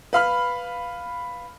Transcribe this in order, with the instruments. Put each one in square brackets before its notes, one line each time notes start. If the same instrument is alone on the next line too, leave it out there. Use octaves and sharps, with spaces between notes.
[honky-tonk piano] B4 F5 B5 F6